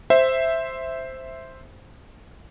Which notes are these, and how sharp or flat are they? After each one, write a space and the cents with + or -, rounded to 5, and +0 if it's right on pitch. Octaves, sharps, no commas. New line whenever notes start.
C5 +0 E5 +0